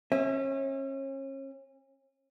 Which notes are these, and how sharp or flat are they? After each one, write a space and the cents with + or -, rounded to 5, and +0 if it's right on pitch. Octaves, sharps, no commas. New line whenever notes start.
C#4 -35 E5 -25